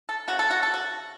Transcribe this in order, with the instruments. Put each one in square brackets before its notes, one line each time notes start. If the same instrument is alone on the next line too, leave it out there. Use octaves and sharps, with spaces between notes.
[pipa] A4
C#3 A3 F#4
A4
F#4
A4
F#4